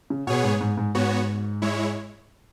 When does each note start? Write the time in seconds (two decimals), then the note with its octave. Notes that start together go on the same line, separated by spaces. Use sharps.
0.10 C#3
0.27 B2 B3 G#4 C#5
0.44 G#2
0.61 G#2
0.77 G#2
0.95 G#2 B3 F#4 C#5
1.62 G#3 E4 C#5